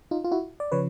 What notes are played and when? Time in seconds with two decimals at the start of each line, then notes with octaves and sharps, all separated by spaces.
0.11 D#4 F4
0.24 F4
0.31 E4 F#4
0.60 D5
0.72 C#3 F3 B4 C#5